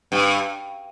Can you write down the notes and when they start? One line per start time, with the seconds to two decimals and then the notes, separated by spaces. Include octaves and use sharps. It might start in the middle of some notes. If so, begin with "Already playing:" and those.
0.12 G2